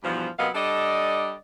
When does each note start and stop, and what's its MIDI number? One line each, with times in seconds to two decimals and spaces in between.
0.03 0.28 40
0.03 0.28 43
0.03 0.28 47
0.03 0.28 53
0.39 0.48 48
0.39 0.48 54
0.39 0.48 58
0.39 0.48 59
0.39 0.48 75
0.39 0.48 77
0.55 1.34 55
0.55 1.34 62
0.55 1.34 69
0.55 1.34 74
0.55 1.34 75